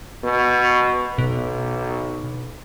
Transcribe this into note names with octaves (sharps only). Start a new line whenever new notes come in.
B2
B1 B2